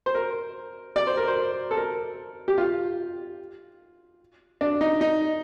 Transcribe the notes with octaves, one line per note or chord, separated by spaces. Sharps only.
C5
A#4
D5
C5
A#4
C5
A4
A#4
G4
F4
D4
D#4
D#4